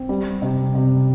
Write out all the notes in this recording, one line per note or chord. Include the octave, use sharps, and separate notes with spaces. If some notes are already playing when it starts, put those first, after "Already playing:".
Already playing: C4
G3
C3
C3